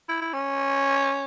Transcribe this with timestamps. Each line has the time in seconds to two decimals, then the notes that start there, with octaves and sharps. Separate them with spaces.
0.09 E4
0.21 E4
0.33 C#4